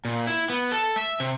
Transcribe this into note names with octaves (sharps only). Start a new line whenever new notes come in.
A#2
E4
B3
A4
E5
C3